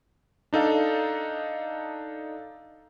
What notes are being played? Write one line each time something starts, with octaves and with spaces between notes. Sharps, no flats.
D4 D#4 A4 F5